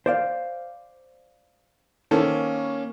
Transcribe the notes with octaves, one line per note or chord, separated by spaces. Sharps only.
C5 D5 F5
D#3 A#3 C#4 A4 C5